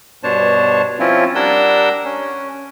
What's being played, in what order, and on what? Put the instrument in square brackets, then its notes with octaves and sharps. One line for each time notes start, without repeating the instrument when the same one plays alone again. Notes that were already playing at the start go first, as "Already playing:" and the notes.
[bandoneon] G2 B2 D4 C5 C#5 A5
F3 C4 C#4 E4 F4
G3 D4 A#4 F#5 E6 G6
C#4